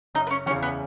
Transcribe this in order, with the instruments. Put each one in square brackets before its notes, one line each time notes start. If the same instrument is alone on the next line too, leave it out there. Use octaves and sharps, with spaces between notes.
[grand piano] F#1 [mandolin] D#4 D#5
[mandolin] B4
C#4 C#5
[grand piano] E2 [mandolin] C#4 C#5
[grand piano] C#3
[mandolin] B3 B4